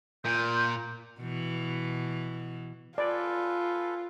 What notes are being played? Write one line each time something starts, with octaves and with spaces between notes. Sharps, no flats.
A#2 G6
B2 E3
F4 A4 B4 D5 G#5